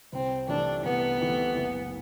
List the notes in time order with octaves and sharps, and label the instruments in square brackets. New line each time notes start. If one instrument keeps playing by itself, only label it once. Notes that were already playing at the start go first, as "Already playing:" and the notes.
[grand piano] C2 [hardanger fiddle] C4
[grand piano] C3 E3 A3 [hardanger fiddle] D4
[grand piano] C2 [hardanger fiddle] B3
[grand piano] C3 E3 A3
F#1